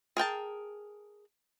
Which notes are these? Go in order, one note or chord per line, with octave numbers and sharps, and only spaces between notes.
G#4 A#4 G5 A5